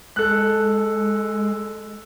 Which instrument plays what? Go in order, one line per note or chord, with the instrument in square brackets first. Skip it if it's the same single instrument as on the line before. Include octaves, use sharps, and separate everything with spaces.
[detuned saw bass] G#3 [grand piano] A4 F#6